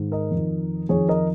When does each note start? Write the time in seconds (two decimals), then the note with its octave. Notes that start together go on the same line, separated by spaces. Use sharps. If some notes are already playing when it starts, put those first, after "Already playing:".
Already playing: G#2 D#3
0.12 A#4 D#5
0.31 F2 D#3
0.89 F2 D#3 G#4 C#5
1.09 A#4 D#5